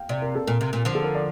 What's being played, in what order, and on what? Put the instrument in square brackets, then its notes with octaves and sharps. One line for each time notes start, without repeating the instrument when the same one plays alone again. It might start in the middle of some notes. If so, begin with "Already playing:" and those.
Already playing: [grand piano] F5 G5
[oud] C3 [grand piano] D5
[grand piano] A#4
A4
[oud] A#2 [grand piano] A#4
[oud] C3
A#2
[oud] D3 F3 [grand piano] C5
[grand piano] A4
A#4
D5